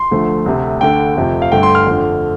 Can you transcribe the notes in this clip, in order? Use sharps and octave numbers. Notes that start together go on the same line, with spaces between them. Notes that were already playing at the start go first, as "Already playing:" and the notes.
Already playing: C6
D2 D3 F3 A3
D2 C3 A3
D2 D3 A3 G5
F2 C3 A3
F5
G1 G2 D3 A3 G5
C6
F6
F2 D3 A3